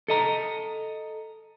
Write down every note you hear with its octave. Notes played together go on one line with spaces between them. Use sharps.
A4 D#5 A#5